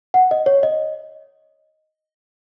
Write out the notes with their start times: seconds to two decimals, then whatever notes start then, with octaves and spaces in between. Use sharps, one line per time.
0.14 F#5
0.31 D#5
0.46 C#5
0.63 D#5